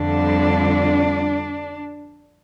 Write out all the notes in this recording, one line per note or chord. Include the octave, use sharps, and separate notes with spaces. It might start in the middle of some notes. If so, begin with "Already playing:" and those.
Already playing: F2 D3 G3 D4